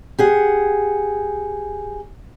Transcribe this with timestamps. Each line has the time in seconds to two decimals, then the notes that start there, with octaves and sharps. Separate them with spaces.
0.19 G4 G#4 F#5